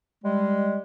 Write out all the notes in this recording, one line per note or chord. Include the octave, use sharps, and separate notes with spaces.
G3 G#3